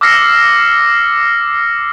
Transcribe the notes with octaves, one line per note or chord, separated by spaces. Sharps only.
D6 E6 F6 A#6 C7 C#7